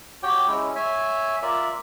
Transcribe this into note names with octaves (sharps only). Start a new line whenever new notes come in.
F#4 G4 C#5 G5
G#3 C#4 E4
C#5 E5 G#5
F4 A#4 D5 E5